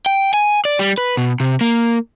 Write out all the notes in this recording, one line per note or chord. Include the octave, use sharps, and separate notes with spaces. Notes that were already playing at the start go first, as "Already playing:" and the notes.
G5
G#5
D5
G3
B4
B2
C3
A#3